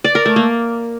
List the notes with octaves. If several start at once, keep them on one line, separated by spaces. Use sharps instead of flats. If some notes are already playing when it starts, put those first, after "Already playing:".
D5
A#4
A3
A#3